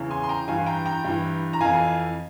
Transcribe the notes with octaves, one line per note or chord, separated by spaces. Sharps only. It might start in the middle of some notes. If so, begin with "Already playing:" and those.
Already playing: E2 C#3 E3
G#5 C6
C6
G5 A#5
G2 E3 F5 G#5
G5 A#5
G5 A#5
G2 E3
A#5
F2 E3 F5 G#5